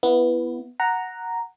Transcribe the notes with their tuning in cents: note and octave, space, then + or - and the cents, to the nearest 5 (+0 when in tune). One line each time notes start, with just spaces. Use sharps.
B3 +0 E4 +20
F#5 +0 A#5 +0